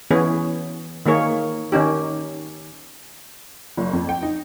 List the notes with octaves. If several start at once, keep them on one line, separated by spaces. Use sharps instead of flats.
E3 B3 C#4 G#4
D#3 A#3 G#4 C#5
D#3 C#4 D#4 G4
F#1
F2
G5
D#4